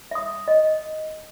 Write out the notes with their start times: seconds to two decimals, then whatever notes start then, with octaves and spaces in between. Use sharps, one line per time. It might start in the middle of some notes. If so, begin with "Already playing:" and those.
0.11 E5 D#6
0.48 D#5